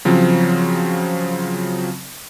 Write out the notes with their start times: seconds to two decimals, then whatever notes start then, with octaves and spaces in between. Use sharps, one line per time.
0.05 C#3 F3 F#3 C4